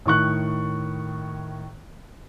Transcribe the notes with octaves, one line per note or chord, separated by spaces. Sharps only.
A2 D#3 C#6 F#6